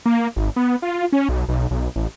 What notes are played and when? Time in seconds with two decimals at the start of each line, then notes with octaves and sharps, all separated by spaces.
0.06 A#3
0.36 G#1
0.56 B3
0.82 F4
1.13 C#4
1.29 B1
1.49 B1
1.71 B1
1.96 A1